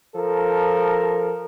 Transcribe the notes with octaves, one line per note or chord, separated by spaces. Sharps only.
F3 A4 A#4